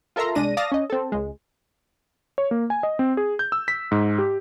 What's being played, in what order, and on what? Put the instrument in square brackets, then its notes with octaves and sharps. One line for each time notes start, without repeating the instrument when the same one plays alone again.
[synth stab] F4 A4 A#4 E5 A#5 C6
C2 G#3 D4 A#6 D#7
D5 F5 A5 D#6 A#6
C#4 D#5
C4 A4
C#2 G#3
[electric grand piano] C#5
A#3
G#5
D#5
C4
G#4
G6
E6
B6
G#2
G4